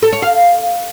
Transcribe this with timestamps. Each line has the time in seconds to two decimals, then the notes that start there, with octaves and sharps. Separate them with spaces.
0.03 A4
0.12 C#5
0.22 F5